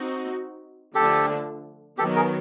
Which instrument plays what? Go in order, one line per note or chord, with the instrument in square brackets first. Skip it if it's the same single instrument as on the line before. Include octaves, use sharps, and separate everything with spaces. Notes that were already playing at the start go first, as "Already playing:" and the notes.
Already playing: [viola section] C4 D#4 F#4
[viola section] D3 F3 A3 D4 [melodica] G4 A4
[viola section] D#3 F#3 B3 [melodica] G4 A4
[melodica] G#4 A#4